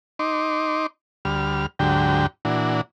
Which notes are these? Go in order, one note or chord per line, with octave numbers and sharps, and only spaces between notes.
D#4 C6 D6
D2 G3 F6
D2 G#2 D3 F#3 G4 G5
A#2 E3 D4 F#4